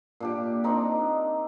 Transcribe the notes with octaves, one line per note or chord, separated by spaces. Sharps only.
A#2 D4 G4
C4 D4 D#4 A#4